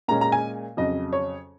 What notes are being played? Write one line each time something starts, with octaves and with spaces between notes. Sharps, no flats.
A#2 G#3 C#4 A#5
A#5
G#5
F2 C#3 F#3 D#5
C#5